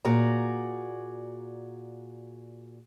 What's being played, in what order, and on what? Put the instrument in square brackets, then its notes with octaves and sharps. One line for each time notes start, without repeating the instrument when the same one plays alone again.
[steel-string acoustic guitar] A#2 F#4 G#4 D5 A#5